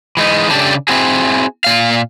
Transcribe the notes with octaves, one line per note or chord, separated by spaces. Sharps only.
E3 G#3 D#4
C#3 D4 G4 A4 A5
C4 E4 F#4 G#4
A#2 F5